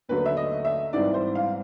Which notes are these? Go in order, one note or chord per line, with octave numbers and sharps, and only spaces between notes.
D#2 D3 F#3 A3 B4
E5
D#5
E5
G#2 E3 G3 C4 D5
C5
F5